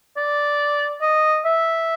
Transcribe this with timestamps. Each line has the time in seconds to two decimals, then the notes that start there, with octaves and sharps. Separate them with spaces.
0.17 D5
1.01 D#5
1.45 E5